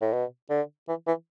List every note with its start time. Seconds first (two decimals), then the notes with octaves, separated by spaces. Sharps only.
0.01 A2
0.13 B2
0.50 D3
0.88 E3
1.07 E3